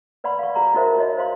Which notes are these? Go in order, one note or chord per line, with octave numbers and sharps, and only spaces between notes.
B4 D5 F#5 B5 C6
F5 C#6
F4 F#4 F#5 A#5 C6 C#6
D#4 F4 F#4 A#4 C5 E5
F#4 C#5 D#5
C5 F5 C6